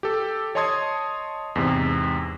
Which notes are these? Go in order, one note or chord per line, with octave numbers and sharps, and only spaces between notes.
G4 A4
C#5 D#5 A5 C6 D#6 G#6
E2 G#2 C3